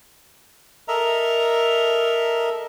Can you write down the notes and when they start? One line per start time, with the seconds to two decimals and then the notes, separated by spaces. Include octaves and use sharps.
0.88 A4 A#4 D#5 E5 A#5